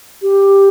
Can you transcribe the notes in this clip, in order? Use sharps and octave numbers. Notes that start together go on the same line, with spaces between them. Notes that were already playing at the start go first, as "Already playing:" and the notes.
G4